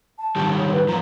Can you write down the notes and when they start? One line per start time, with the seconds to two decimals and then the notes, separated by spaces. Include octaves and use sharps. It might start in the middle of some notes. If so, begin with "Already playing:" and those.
0.19 A5
0.36 G#2 D#3 G3
0.59 C#5
0.72 B4
0.88 G#2 F3 A#5